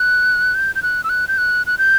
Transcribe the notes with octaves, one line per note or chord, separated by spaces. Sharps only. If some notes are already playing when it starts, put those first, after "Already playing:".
Already playing: F#6
G6
G6
F#6
E6
F#6
G6
F#6
F#6
G6